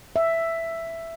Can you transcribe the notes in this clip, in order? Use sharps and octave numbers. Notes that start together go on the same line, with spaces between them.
E5